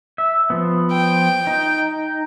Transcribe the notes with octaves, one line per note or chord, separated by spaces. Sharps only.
E5
F3 B3
G5
D#4